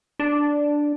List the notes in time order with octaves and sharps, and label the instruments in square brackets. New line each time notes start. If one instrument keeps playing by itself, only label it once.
[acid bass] D4